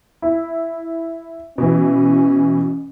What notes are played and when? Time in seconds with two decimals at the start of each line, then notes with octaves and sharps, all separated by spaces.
0.22 E4
1.58 B2 E3 C#4